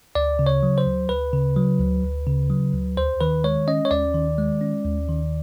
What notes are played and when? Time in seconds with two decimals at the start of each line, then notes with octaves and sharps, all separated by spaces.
0.15 D2 D5
0.39 C#3
0.47 C#5
0.63 F#3
0.78 C5
0.86 D2
1.09 D2 B4
1.33 C#3
1.56 F#3
1.79 D2
2.03 D2
2.27 C#3
2.50 F#3
2.74 D2
2.97 D#2 C5
3.21 D#3 B4
3.44 G#3 C#5
3.68 C#4 D#5
3.85 C#5
3.91 D#2 D5
4.14 D#3
4.38 G#3
4.61 C#4
4.85 D#2
5.08 D#3